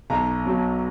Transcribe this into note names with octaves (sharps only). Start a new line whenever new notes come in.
B1 A#5
B2 F#3